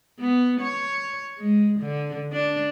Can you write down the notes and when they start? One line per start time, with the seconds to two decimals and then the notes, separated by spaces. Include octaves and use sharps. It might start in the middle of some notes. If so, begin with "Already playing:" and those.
0.19 B3
0.61 C#5
1.38 G#3
1.80 D3
2.32 D4